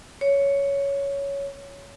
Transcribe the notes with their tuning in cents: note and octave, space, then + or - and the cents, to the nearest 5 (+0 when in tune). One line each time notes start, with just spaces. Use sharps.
C#5 +10